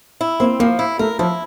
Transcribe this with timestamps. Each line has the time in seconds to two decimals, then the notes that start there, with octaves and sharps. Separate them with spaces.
0.21 E4
0.40 A#3 C4
0.60 F3 A#3
0.79 E4
0.99 A3 A#4
1.19 F3 E4